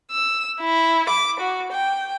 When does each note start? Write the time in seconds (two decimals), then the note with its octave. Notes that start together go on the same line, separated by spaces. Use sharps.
0.12 E6
0.60 E4
1.09 D6
1.40 F#4
1.73 G5